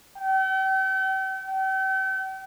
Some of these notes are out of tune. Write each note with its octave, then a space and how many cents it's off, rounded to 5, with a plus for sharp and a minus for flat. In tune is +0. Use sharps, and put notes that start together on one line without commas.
G5 -45
G5 -40